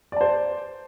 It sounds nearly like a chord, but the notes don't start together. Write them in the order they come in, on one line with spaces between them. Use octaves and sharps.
D5 A5 C5